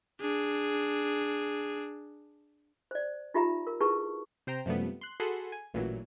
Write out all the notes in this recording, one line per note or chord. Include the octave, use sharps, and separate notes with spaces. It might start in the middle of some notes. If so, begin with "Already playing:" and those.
D4 G#4
C5 D5
D#4 F4 G4 E5 A#5
A#4
E4 G4 G#4 B4 A5 C#6
C3 C5 G5 A#5
F#2 C3 F3 G3 A3 B3
C6 F#6
F#4 G#4 A4 F#5 B5 C6
G#5
A1 A#2 E3 F#3